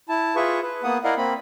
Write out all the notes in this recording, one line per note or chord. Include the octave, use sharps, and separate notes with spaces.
E4 A5
F4 G#4 B4 E5 C#6
B4
A#3 B3 F#5 D#6
E4 A#4 D5 D#5 F5 F#5
A#3 C4 B5